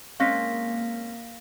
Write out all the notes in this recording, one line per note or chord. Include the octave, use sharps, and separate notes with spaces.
G#3 A#3 C4 C#4 F5 A#6 B6